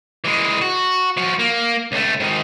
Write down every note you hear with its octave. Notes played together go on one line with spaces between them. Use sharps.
E3 G#3
F#4
F3 F#4
A#3
C#2 A3
G#2 D#3